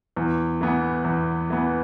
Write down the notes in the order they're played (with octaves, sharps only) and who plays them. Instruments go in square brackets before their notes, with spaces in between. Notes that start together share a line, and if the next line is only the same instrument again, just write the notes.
[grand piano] E2
E3 B3
E2
E3 B3